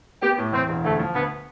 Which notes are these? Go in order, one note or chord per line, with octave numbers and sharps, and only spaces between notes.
B3 G4
A2
E2 C4
E1
D2 A3
F3
D2 B3